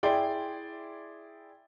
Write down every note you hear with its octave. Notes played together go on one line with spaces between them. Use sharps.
E4 G#4 D5 G5 C6